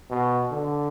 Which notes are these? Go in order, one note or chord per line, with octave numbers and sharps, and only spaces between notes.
B2
D3